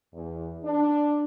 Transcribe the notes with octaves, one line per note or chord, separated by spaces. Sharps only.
E2
D4